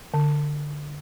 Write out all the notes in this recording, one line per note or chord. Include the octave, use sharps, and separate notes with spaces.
D3